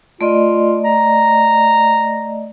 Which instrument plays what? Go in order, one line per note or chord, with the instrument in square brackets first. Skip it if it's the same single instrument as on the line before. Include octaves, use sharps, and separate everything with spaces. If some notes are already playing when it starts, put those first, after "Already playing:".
[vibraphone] A3 D5 D#5 [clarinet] F4
[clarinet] A#5